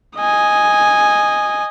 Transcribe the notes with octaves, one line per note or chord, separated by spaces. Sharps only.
D#5 G#5